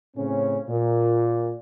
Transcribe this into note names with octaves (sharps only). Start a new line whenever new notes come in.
A2 C#3 C4 C#4
A#2